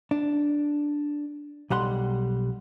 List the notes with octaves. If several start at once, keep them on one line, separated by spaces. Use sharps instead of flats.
D4
B1 G3 F#5 C6